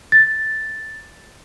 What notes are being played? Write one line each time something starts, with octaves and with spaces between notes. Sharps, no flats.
A6